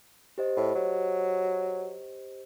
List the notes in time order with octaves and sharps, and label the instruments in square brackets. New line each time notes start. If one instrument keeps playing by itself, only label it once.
[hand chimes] G4 C5 D#5
[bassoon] A2
F#3